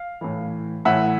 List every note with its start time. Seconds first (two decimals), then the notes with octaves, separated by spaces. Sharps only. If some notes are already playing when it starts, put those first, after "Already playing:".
Already playing: F5
0.21 A2 E3
0.85 A2 E3 E5 F#5